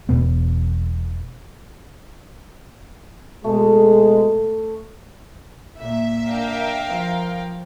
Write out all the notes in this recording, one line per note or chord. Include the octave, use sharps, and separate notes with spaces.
E1 B2 B3
B2 G#3 A3
A#2 A#3 E5
D4 A#4 F5 G5
F3